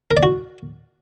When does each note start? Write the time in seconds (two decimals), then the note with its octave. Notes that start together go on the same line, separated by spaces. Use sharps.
0.11 A#4
0.17 D5
0.23 F#4